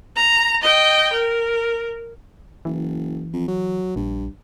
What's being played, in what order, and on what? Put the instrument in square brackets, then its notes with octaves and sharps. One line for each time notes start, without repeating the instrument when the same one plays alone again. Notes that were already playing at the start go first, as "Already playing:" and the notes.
[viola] A#5
D#5 G5
A#4
[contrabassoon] F#1 [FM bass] E3
[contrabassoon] F2
F#3
[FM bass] A#1 [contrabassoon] G2